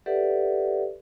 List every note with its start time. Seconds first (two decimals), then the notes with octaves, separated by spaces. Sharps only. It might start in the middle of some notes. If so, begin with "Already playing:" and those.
0.06 G4 A4 B4 D5 E5 F#5